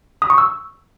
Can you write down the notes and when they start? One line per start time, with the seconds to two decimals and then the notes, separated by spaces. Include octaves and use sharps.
0.22 D#6
0.30 C#6
0.38 E6